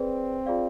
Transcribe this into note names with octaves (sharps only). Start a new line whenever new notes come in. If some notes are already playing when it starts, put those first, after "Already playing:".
Already playing: C4 G#4 B4 D5
F4 G#4 D5 F5